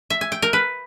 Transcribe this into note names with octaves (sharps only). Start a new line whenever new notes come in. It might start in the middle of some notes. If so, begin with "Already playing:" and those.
E5
G#5
G5
A#4
B4